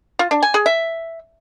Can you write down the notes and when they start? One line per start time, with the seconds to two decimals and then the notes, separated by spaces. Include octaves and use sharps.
0.19 F4
0.31 D4
0.43 G#5
0.54 G#4
0.66 E5